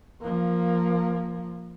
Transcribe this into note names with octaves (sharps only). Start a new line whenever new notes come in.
F3 A#3